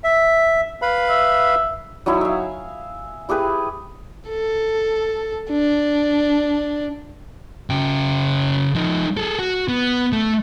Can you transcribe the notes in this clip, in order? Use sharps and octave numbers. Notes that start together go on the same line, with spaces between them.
E5
B4 F5 B5
E5
F#3 D#4 E4 G#5
E5 F5
E4 G4 G#4 B4
A4
D4
C#3 G5
F3 D#4
G#4 A4
F#4
B3
A3